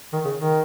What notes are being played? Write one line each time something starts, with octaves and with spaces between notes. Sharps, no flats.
D#3
C#3
D#3